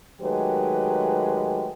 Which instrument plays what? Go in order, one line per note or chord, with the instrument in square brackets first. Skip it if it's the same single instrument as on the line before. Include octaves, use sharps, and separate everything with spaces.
[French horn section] D#3 F#3 G#3 A3 G4 B4